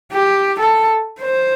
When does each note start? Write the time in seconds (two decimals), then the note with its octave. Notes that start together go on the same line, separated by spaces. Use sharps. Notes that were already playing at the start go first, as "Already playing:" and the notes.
0.12 G4
0.59 A4
1.22 C5